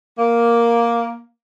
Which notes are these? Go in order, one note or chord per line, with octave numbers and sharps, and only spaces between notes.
A#3